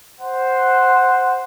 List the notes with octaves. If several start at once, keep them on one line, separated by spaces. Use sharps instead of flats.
C5 F#5